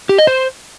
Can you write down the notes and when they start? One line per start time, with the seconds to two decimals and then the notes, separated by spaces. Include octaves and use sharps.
0.09 G4
0.18 D#5
0.27 C5